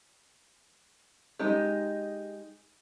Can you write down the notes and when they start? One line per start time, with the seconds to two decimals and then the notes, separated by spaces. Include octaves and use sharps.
1.39 G#3 D#4 G4